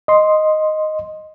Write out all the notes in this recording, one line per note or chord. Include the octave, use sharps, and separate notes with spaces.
D#5 C6